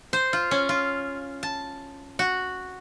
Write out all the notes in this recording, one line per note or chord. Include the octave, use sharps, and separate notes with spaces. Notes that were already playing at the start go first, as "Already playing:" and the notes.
C5
F4
C#4
F4
A5
F#4